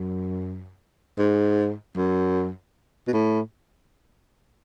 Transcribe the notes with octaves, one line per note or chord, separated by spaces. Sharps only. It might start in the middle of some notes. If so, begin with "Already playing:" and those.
Already playing: F#2
G#2
F#2
B2
A2